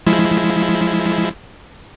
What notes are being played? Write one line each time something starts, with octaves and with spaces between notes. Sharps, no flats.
F3 G#3 E4